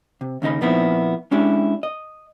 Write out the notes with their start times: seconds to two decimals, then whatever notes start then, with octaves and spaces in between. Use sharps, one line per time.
0.21 C3
0.42 D#2 C#3 D#4 D#5 B5
0.61 A#2 F3 B3 C4 D#4 E4
1.31 G#3 C#4 D4 E4 G4
1.83 D#5